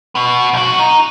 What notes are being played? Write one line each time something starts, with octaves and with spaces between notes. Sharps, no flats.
B3 F#4
B1 F#4
D#4